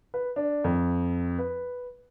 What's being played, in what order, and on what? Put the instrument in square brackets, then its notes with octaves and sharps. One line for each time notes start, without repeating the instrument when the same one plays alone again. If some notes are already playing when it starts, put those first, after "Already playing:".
[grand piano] B4
D4
F2
B4